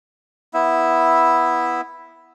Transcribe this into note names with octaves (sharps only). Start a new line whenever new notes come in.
B3 E4 E5